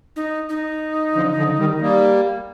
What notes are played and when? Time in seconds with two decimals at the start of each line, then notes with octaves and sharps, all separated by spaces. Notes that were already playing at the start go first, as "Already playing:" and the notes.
0.16 D#4
0.49 D#4
1.14 D3 F3
1.37 D3 F3
1.58 D#3 G3
1.82 G3 A#3